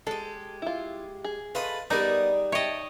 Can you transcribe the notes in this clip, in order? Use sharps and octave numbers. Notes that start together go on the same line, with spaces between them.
G#3 G4 A4
E4 F4
G#4
A3 F4 B4 D#5 D#6
G3 B3 D#4 G#4 A#4 D5
C#5 D#5 E5 G5 A5